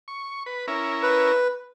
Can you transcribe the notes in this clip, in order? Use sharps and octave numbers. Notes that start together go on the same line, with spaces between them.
C#6
B4
C#4 E4 A#4
B4